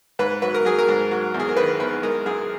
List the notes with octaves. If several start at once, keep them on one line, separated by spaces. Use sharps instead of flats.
G#2 B4
F#3 B4
A#4
F#3 G#4
A#4
G#2
F#3
E2
G#4
A#4
D#3 B4
E2 B4
G#3 A#4
F#2 G#4